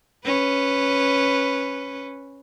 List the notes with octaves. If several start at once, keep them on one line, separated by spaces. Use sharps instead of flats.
C#4 B4